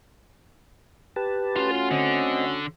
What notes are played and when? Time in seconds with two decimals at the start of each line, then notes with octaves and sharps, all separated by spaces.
1.16 G4 B4 A5
1.56 A3 C#4 F4 F#4 C6
1.91 D3 C4 D#5